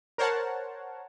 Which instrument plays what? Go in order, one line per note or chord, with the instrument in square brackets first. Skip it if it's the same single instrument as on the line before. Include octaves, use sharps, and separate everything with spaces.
[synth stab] A#4 C5 C#5 F#5 A5